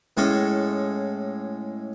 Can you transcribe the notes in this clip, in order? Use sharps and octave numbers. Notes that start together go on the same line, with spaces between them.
A2 G#3 C#4 A4